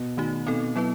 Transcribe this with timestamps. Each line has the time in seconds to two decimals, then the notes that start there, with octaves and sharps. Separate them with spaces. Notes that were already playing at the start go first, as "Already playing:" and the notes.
Already playing: B2
0.17 D#3 A3 D#4 F#4
0.46 B2 C4 D#4 A4
0.76 F#3 B3 E4 B4